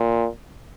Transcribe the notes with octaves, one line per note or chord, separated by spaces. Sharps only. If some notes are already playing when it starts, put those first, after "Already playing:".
Already playing: A#2